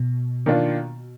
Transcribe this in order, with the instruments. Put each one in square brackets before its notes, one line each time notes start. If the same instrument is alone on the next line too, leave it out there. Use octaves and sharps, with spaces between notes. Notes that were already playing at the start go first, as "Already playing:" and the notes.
Already playing: [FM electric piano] B2
[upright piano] D#3 A#3 D4 F4